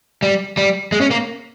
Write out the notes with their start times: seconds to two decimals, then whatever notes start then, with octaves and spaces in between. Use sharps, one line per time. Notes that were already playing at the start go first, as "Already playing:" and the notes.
0.22 G3
0.57 G3
0.92 G#3
1.01 C#4
1.11 A#3